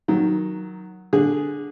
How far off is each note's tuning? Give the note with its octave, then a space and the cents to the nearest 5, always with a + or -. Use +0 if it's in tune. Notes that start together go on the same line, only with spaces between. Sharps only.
D#3 +5 F#3 +0
D3 +0 G#4 +0